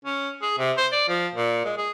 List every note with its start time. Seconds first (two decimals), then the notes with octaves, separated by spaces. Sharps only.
0.05 C#4
0.42 G#4
0.58 C3
0.78 C5
0.92 D5
1.08 F3
1.35 A#2
1.65 G#3
1.78 G#4